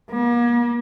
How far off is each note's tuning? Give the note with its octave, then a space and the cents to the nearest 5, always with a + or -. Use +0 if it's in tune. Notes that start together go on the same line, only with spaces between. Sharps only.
A#3 +45